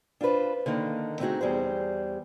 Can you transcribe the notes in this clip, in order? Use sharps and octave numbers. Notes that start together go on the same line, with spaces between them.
D4 F4 G4 B4 C5
D3 D#3 A#3 D#4
A3 C4 D#4 F4 F#4 G#4
E2 G3 G#4 C5